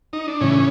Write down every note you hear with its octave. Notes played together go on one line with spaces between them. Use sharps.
D#4
D4
A2 C#3 E3 C#4